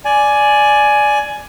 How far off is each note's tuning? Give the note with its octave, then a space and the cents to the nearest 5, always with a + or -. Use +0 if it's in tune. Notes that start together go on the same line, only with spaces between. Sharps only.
D5 +0 G#5 +15